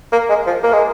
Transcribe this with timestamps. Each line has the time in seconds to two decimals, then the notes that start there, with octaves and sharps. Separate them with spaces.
0.12 A#3
0.29 G#3
0.47 F3
0.63 A#3
0.73 G#3